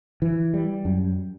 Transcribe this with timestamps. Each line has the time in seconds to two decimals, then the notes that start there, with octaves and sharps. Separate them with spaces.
0.22 E3
0.54 G3
0.85 F#2